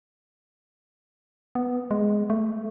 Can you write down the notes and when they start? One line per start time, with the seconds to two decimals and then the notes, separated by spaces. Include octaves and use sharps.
1.55 B3
1.91 G#3
2.30 A3